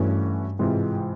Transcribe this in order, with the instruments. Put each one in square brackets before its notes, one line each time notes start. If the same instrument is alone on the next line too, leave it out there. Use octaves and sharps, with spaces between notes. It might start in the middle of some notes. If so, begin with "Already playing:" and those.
Already playing: [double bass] G2 [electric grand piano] E3 A3 C#4 F#4
[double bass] G#2 [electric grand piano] C3 E3 G#3 C4 F4